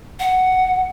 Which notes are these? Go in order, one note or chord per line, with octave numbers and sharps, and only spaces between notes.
F#5